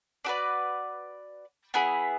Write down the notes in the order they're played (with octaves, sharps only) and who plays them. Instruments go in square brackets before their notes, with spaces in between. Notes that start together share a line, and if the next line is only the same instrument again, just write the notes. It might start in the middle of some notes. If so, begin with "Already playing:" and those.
[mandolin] D4 F#4 B4 D5
B3 E4 G#4